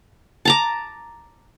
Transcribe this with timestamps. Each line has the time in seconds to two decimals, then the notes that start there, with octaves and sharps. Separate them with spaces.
0.45 A5 A#5 D6